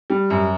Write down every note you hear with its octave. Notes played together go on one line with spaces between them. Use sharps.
G3
F#2